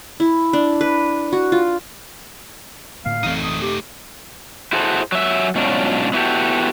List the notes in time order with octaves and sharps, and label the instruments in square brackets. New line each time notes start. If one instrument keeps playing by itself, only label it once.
[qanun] E4
D4
B4
F#4
F4
[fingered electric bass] A2 D3 A#3 [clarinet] F5
[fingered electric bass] A1 E3 C4 [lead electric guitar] A3 D#4
[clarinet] D#6
G4
[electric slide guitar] E4 F#4 G#4 A4 C5
F#3 E5
G#2 B2 F#3 C#4 D4 F4
B3 E4 F#4 G4 A4